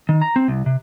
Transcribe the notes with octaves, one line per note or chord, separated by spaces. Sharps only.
D#3
A#5
C4
C2
C3